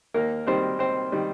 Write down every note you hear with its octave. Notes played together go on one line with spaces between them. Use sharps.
D#2 A#3 A#4
D#3 G3 C4 C5
D#2 C4 C5
D#3 G3